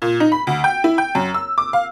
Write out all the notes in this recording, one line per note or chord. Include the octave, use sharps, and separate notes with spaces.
A#2
D#4
B5
D2
G5
E4
G5
F#2
E6
D6
F5